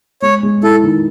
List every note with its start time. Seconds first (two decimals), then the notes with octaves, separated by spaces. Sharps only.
0.22 G#3 C#5
0.43 G#3
0.63 E4 A4
0.83 D#3